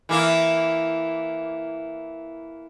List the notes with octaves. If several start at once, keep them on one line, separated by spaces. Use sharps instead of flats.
E3 A#3 E4